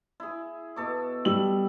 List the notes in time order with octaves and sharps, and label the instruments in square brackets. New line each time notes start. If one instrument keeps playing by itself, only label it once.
[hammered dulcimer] E4 G#4
B2 A4 D6
[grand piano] G3 E6 F#7